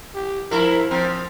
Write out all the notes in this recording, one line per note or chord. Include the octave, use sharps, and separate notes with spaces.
G4
F3 E4 A#4
F3 C4 A#4